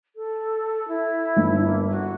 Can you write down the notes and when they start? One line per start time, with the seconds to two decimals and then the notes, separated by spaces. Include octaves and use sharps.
0.16 A4
0.88 E4
1.36 G1
1.64 A#3
1.90 F#4